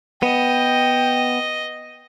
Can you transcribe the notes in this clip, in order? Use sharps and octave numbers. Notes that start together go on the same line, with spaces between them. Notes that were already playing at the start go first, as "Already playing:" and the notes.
B3 D#5 G5